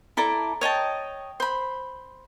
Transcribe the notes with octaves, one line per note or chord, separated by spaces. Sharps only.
E4 A4 D5 A#5
C#5 D#5 G5 A5
C5 B5